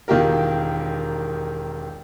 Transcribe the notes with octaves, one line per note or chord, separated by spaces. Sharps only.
E1 D#3 F4 G4 A#4